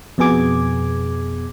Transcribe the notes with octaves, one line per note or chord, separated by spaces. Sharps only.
F2 B2 B3 G#4 D6 G#6